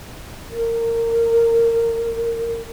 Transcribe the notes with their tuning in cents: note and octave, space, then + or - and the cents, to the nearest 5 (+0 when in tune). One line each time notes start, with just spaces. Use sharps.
A#4 -20